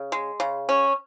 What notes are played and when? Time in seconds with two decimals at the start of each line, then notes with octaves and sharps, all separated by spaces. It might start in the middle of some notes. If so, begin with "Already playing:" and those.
Already playing: C#3
0.12 G#3
0.40 C#3
0.69 C#4